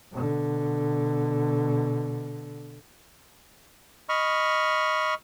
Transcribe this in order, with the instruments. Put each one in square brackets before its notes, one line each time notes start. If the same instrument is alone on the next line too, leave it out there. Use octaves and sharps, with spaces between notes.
[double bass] B2 D3
[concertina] D#5 B5 C#6 F6